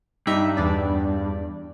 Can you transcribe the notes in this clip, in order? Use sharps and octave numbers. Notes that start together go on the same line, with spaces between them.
G2 D#4 G4 E5
E2 D4 D5